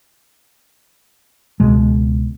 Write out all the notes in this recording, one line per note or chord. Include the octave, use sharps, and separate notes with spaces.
C#2 B2 G#3